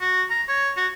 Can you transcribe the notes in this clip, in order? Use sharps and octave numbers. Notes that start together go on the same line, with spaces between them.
F#4
A#5
C#5
F#4